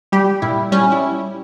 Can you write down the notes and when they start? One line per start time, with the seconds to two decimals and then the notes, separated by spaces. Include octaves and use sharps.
0.12 G3 G4
0.42 A#2 E4
0.72 G3 C#4
0.92 E4